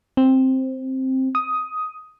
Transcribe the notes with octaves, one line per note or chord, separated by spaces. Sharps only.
C4
D#6